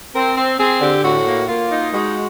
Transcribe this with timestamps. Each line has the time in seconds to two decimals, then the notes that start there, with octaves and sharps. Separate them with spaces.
0.15 C4 A#4
0.37 C4
0.59 C4 G#4
0.81 D3 G4
1.03 A2 F#4
1.26 A#3
1.48 A#3 F4
1.71 D#4
1.94 G#3 F#4